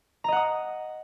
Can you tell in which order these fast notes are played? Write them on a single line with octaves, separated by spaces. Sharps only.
A#5 D#5 F#5 D#6